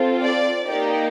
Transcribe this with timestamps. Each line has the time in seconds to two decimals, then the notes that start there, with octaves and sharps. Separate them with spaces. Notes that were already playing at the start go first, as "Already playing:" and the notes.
Already playing: C4 F4 A4
0.23 D5
0.66 A#3 D#4 G4 D5